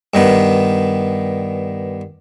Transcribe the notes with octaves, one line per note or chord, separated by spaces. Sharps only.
G2 D#3 B3